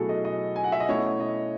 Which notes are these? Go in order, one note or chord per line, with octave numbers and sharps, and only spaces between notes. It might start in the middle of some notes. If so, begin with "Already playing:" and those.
Already playing: B2 F#3 A3 E4 F#4 G#4 A4
D#5
D#5
G#5
F#5
E5
D#5
B2 A3 C#4 E4 C#5
D#5